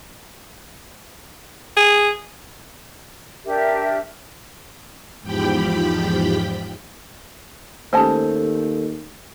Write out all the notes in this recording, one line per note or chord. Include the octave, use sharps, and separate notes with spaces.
G#4
D4 G4 A#4 E5
E2 G#2 F3 G4 G5 B5
D#2 A3 C#4 G4 A4 C5 G#5 A5